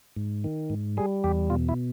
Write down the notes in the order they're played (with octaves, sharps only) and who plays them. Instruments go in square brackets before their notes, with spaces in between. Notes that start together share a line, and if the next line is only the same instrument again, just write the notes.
[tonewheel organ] G#2
D#3
G#2
G3 G#4
E2 G4
B2 F4
E4